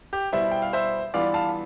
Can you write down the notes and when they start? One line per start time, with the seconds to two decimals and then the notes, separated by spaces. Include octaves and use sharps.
0.13 G4
0.32 B2 G3 B3 E4 C5 E5
0.51 G5
0.62 F5
0.73 C5 E5
1.14 E3 G3 B3 D4 F4 D5 F5
1.34 F5 A5